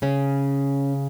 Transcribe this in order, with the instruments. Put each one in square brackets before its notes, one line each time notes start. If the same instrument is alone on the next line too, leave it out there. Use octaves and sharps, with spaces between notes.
[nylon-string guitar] C#3 C#4